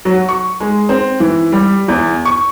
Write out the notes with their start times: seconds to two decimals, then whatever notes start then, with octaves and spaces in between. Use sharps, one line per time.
0.05 F#3
0.29 C#6
0.60 G#3
0.89 C4
1.20 E3
1.52 G3
1.88 E2
2.25 C#6